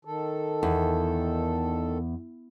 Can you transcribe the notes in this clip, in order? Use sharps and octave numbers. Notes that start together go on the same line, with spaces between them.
D#3 A4
E2